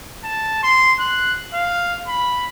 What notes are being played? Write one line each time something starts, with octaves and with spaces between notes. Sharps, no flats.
A5
C6
F#6
F5
B5